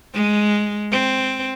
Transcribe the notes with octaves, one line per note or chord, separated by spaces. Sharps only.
G#3
C4